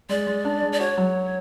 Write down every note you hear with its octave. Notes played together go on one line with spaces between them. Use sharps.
G#3 D5
G#3
D4
G#3
D5
F#4 C#5
F#3